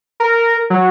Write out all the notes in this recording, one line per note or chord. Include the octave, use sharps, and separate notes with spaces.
A#4
F#3